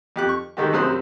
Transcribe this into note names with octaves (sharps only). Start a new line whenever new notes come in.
F2 G4 F#6
C#6
D#3 G#3 A3 F#4 G4
A#1 F#2 C3 C5 D#6 F#6